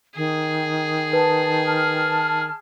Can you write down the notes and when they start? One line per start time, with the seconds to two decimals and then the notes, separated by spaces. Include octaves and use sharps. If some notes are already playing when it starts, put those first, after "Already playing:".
0.16 D#3 G#4
1.13 B4 A5
1.66 A5 F6